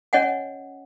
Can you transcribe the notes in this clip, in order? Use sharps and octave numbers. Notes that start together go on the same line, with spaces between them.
C#4 C#5 D#5 F#5 G#5